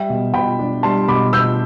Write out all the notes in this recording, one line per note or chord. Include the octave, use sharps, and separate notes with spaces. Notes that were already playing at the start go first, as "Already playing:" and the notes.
Already playing: G3 E5 G5
B2
B2 G5 B5
D4
G3 A5 C6
B2 B5 D6
B2 E6 G6